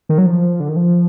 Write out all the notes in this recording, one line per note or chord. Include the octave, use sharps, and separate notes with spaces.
D#3
F#3
F3
D3
D#3
F3